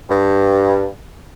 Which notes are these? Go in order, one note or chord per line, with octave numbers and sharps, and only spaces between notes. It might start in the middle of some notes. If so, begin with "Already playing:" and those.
G2